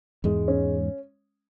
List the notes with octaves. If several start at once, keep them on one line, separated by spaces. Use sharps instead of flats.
E2 G#2 G#3
C#4